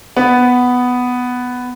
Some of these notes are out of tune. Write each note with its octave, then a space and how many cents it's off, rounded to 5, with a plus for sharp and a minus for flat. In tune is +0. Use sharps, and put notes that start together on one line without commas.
B3 +5